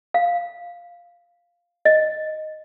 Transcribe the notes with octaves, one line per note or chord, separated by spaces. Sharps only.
F5
D#5